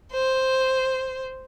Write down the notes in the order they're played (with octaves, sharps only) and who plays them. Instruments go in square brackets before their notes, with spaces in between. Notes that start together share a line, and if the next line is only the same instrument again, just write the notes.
[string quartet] C5